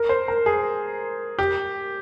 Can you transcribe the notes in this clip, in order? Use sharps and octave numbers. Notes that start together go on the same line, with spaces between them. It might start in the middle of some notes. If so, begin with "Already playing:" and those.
Already playing: A#4
C5
A#4
G#4
G4